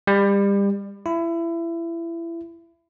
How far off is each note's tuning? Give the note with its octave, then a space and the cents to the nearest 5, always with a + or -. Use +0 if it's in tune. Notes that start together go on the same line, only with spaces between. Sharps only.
G3 +30
E4 +25